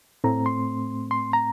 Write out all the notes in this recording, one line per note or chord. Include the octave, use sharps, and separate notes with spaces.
A2 A3 C4 A#5
C6
C6
A#5